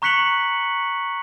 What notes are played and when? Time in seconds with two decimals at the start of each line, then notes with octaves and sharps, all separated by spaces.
0.02 A#5 C#6 F#6 B6 C#7 F#7